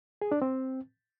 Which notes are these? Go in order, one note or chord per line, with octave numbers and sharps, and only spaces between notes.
G#4
D4
C4